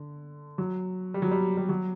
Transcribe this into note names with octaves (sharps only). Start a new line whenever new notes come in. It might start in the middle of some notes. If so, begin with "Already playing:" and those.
Already playing: D3
F#3
G3
F#3
G3
G3
F#3